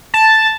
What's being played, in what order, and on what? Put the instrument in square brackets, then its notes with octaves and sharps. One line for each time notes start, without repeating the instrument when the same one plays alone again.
[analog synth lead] A5